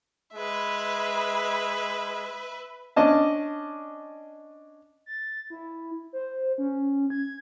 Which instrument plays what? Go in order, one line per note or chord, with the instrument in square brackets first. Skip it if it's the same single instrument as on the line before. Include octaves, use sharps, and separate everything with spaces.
[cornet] G#3 [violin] B4 E5
[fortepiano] C#4 D4 D#5 A5
[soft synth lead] A6
E4
C5
C#4
G#6